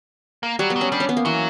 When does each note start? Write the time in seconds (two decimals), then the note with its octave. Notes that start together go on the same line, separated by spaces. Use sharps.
0.43 A#3
0.59 F#3 G3
0.70 B3
0.76 F#3
0.81 C#4
0.92 G3 D4
1.00 C#4
1.09 B3
1.17 A#3
1.25 E3 F#3